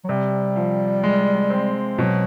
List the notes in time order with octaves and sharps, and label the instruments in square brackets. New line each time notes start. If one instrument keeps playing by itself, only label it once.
[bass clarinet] F#3
[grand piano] C3 [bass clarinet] G3
[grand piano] F3
G#3
C4
[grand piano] B2 [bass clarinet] F#3